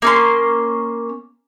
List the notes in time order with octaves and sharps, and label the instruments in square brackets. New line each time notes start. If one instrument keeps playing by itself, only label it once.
[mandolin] A#3 C#4 C6